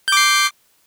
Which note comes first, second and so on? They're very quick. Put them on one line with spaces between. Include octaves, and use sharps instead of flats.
G6 D6 C7